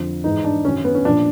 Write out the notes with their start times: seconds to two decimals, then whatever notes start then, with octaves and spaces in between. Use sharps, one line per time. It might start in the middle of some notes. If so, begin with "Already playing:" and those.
Already playing: F2 D3 F3
0.24 G#2 E3 D#4
0.44 D4
0.64 D#3 C#4
0.69 F#2
0.84 B3
0.95 C#4
1.05 A#2 F3 D4